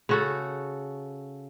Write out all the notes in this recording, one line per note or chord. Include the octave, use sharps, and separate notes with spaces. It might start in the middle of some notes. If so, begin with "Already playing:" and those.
C#3 F#4 A4